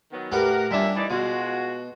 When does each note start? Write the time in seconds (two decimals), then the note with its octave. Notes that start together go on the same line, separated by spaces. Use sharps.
0.11 D#3 F#3 B3
0.32 A2 G4 A#4 B4 F#5
0.71 A#2 G3 C#4 D4 E5
0.96 E3 D#4 D5
1.10 B2 G#3 F4 F#4